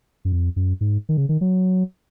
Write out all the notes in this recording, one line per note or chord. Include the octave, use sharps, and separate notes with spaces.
F#2
F2
F#2
G#2
D#3
C#3
D#3
F#3